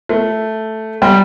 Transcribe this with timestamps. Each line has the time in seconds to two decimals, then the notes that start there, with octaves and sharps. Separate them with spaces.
0.09 A3
1.02 G3